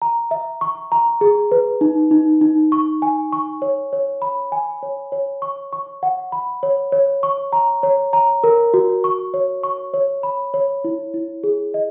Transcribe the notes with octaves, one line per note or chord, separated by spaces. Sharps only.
A#5
E5
C#6
A#5
G#4
B4
D#4
D#4
D#4
C#6
G#5
C#6
C#5
C#5
B5
G#5
C#5
C#5
C#6
C#6
F#5
B5
C#5
C#5
C#6
A#5
C#5
A#5
A#4
F#4
C#6
C#5
C#6
C#5
B5
C#5
E4
E4
G#4
D#5